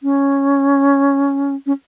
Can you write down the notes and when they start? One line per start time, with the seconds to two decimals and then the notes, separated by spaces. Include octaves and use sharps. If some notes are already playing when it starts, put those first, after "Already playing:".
0.03 C#4
1.66 C#4